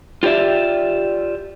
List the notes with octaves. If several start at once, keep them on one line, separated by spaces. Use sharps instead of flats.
F4 G4 A#4 D5 E5